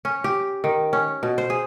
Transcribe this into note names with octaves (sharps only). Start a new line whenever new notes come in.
C#4
G4
D#3
C#4
B2
C5
G#4